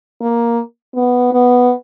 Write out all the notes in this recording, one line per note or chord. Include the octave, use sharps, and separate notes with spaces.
A#3
B3
B3